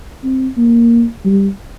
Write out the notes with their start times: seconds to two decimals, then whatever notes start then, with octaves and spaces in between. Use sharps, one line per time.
0.24 C4
0.57 A#3
1.25 G3